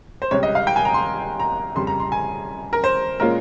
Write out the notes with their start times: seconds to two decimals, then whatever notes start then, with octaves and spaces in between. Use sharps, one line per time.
0.22 C5
0.31 C#2 C3 G3 C#5
0.43 D#5
0.55 F5
0.67 G5
0.76 G#5
0.85 A#5
0.94 C6
1.40 A#5
1.75 F2 C#3 G3 C6
1.87 A#5
2.00 C6
2.12 G#5
2.73 A#4
2.84 C5
3.20 A#2 G#3 C#4 F4 A#4